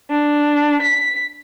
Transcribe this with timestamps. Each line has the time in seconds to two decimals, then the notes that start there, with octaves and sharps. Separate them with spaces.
0.10 D4
0.82 B6